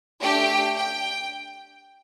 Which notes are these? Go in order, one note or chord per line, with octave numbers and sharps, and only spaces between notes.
A3 D4 G4 G5
G5